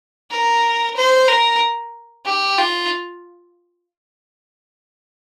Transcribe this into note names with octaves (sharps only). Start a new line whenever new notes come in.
A#4
C5
A#4
G4
F4